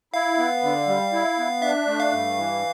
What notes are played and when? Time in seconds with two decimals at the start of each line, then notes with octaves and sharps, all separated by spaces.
0.14 E4 F5
0.38 B3
0.63 D3
0.88 G3
1.12 E4
1.38 B3
1.62 D4 E5
1.87 A3
2.00 F5
2.12 G2
2.37 E3